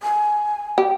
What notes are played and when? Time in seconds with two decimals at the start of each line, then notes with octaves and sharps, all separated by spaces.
0.03 G#5
0.78 G4